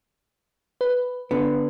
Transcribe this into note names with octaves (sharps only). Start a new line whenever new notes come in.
B4
D3 B3